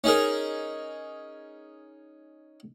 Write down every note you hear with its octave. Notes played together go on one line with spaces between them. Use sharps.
C#4 D#4 G#4 A#4